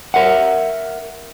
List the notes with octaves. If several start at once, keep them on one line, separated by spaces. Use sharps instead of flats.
A#4 E5 F#5